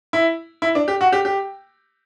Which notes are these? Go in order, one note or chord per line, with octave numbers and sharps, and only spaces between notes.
E4
E4
D4
G4
F#4
G4
G4